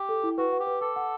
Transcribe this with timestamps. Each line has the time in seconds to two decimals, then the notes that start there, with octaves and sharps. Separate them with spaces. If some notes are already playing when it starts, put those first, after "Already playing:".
Already playing: G4
0.09 A4
0.23 E4
0.38 F#4 B4
0.53 F#5
0.60 G4
0.67 B4
0.81 A4 D6
0.96 F#5